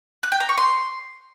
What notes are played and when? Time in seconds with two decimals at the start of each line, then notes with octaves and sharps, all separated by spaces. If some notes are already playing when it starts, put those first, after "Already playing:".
0.23 F#6
0.32 G5
0.40 A#5
0.49 C#6
0.58 C6